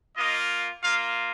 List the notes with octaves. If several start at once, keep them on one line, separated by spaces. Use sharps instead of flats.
A#3 F4 D#5
A#3 F4 F5